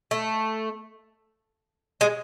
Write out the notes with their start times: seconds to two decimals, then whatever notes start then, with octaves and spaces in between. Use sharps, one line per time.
0.11 A3
2.01 G#3